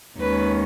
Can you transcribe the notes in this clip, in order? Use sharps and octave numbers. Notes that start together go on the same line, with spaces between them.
D#2 D#3 G#3 C#4 B4